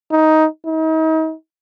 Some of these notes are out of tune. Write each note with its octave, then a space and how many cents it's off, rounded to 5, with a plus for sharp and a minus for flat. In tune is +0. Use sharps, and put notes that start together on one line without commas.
D#4 +10
D#4 +40